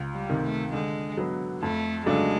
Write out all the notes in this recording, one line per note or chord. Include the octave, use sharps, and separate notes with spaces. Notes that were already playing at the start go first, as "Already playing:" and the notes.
Already playing: C#2
G3
C3 D#3
A3
D3 G#3
F#3 B3
F2 A3
C#3 F#3 G#3 A3 D4